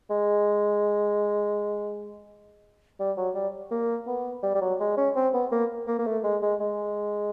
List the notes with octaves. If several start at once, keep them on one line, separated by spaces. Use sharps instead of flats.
G#3
G3
F#3
G3
A#3
B3
G3
G3
F#3
G#3
C#4
C4
B3
A#3
A#3
A#3
A3
G#3
G#3
G#3